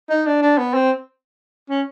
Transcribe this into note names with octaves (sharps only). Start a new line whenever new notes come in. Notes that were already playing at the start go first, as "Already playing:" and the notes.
D#4
D4
D4
B3
C4
C#4